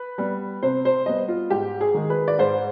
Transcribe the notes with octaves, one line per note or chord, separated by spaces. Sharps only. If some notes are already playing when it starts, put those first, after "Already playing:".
Already playing: B4
G3 B3
C3 C5
C5
G3 B3 D#5
F4
G#2 G4
G#4
D#3 G#3
B4
D5
G#2 C5